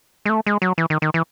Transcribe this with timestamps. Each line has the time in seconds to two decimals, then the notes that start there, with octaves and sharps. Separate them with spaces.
0.26 G#3
0.29 A3
0.46 G#3
0.62 F#3
0.78 E3
0.90 D#3
1.02 D#3
1.14 E3